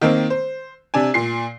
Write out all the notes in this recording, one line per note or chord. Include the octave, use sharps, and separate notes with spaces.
D#3 A#3 C4
C5
C3 D4 G#5
A#2 C7